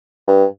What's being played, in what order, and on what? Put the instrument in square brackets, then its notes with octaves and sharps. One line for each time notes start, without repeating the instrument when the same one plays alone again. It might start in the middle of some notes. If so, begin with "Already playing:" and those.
[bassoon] G2